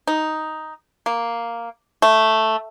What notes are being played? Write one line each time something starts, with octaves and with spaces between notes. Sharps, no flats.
D#4
A#3
A3